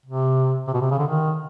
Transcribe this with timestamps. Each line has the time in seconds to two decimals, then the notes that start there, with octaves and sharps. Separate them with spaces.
0.06 C3
0.67 C3
0.73 B2
0.81 C3
0.91 C#3
0.98 D3
1.07 D#3